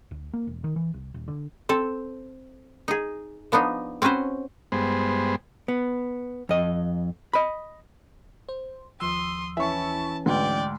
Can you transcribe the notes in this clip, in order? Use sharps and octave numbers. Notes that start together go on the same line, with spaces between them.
D2
A#3
E1
D#3
E3
C2
D#1
D3
C4 A4
D#4 G#4
F3 B3 D4 D#4
C4 C#4 F#4 B4 C5
G2 G#3 B3 C5
B3
F2 D#5
D#5 B5
C5
D#2 F3 C6 D#6 E6
E3 C#4 E4 E5 A5 C#6
D2 G#2 B4 D5 G5